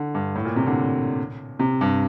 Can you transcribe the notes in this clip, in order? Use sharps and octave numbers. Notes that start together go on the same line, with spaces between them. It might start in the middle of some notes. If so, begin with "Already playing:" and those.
Already playing: D3
G2
A2
A#2
C3
D3
C3
G2